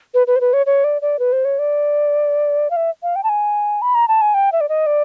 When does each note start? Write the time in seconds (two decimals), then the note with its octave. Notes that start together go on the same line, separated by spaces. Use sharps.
0.14 B4
0.27 B4
0.36 C5
0.41 B4
0.53 C#5
0.66 C#5
0.84 D5
1.02 D5
1.19 B4
1.33 C5
1.45 C#5
1.59 D5
2.71 F5
2.76 E5
3.03 F5
3.16 G5
3.24 A5
3.29 G#5
3.82 B5
3.95 A#5
4.08 A5
4.22 G#5
4.34 G5
4.52 E5
4.61 D5
4.69 D#5
4.86 D5